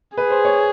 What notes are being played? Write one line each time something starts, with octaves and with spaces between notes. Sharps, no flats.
G#4 B4
C5
C#5